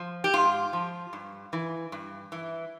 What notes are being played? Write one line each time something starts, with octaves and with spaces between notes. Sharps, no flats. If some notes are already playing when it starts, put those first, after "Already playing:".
Already playing: F3
G4
G#2 F4
F3
G2
E3
G2
E3